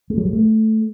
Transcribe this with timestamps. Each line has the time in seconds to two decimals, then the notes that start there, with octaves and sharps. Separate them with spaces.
0.10 G#3
0.18 F#3
0.25 G3
0.33 A3